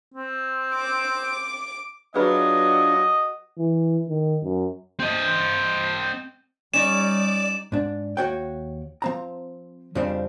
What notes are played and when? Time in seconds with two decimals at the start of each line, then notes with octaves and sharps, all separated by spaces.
0.14 C4
0.76 D6
2.16 F#3 D4 F4 G#4 B4 D#5 B5
3.58 E3
4.09 D#3
4.43 F#2
5.00 C4 D#5
6.74 G3 C#4 D#4 D5 D6 E7
7.72 G#2 D4
8.17 D#2 F#4 C#5 G5
9.02 F3 C4 A#5
9.95 F2 C#3 F3 G3 C4 D4